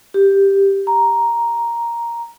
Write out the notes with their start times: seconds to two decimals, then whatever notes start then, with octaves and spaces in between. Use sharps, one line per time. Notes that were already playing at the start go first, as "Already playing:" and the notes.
0.14 G4
0.87 A#5